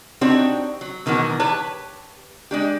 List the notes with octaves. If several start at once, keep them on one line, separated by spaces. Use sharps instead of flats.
C4 D4 D#4 F#4 G4 C#5
F#3
B2 D#3 E3 F#3 B3
G4 B4 C#5 A5
G#3 D4 G4